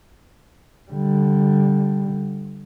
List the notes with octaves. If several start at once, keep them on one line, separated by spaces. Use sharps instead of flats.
D3 G3